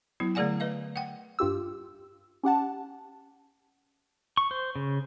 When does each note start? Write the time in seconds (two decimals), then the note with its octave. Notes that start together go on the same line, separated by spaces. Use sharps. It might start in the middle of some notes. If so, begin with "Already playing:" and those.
0.20 F#3 B3 E4
0.35 D3 A3 G#4 D5 F#5 G#5
0.60 B4 D#5 F5
0.96 F#5 G5
1.39 G2 F4 G4 E6
2.43 C#4 G4 F#5 A5
4.37 C#6
4.51 C5
4.76 C#3